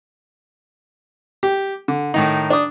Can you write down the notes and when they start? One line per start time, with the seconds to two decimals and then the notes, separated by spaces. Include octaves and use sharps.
1.43 G4
1.88 D3
2.14 A2 D#3 D#4
2.50 D4 D#6